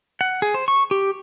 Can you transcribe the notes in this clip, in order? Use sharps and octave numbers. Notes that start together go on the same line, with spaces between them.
F#5
G#4
C5
C#6
G4